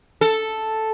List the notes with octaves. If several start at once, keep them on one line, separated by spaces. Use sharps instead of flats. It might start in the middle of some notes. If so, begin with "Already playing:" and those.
A4